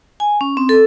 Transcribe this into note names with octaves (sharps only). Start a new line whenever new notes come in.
G#5
C#4
C4
A4